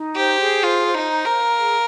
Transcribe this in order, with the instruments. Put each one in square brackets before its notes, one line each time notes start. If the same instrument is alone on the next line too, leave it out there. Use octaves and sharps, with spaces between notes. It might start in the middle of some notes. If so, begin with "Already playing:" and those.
Already playing: [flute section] D#4
[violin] G4 [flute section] C5
[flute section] G#4
[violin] F4 [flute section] C5
[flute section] C5
[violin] D#4
[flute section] A#5
[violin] A#4
[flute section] F5
G#4